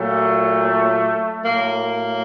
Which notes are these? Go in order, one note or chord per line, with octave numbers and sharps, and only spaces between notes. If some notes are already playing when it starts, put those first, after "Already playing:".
Already playing: A#2 F#3 A3
A2 F#3 A#3